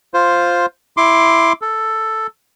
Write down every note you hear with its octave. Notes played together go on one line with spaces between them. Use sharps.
F4 C5
E4 C6 D6
A4